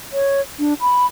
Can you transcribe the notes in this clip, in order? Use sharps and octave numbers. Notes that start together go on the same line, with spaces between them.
C#5
D4
B5